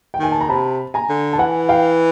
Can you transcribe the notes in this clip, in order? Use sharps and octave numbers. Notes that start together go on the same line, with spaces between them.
G5
D#3 G#5
A5
A#5
C3 A5 B5
G#5 A#5
D3
A5
E3 F#5 G#5
F5 G5